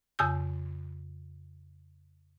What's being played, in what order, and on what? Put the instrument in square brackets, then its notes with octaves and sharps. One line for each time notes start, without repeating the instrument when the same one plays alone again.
[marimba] F2 C#3 G#5 D#6 E6 G6